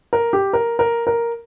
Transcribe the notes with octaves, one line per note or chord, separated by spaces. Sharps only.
A#4
G4
A#4
A#4
A#4